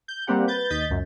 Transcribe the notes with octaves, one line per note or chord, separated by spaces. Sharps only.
G6
G3 A#3 C4 G4 F#5
B4 G6 A6
D#2 D#5 G6 A6 B6
C#2 F#2